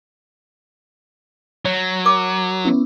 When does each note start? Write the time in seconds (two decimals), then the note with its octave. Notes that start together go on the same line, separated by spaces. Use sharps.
1.65 F#3 C#5
2.05 A#4 D6
2.65 B3 C#4 E4